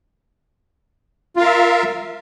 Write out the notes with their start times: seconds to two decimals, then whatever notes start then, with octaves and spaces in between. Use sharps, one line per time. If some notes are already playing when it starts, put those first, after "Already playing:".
1.36 F4
1.39 F5
1.42 A#4
1.44 E5